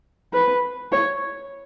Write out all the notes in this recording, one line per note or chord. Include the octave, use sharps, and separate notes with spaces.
B4
C#5